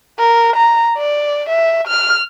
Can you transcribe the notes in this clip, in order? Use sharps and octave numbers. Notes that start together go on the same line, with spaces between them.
A#4
A#5
D5
E5
F6